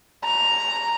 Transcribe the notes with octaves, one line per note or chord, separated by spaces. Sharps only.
A#5